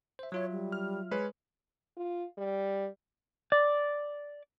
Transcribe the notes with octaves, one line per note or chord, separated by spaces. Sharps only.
C5 E5
F#3 F4 C#5 E5
G3
F6
G#3 B4 C#5
F4
G3
D5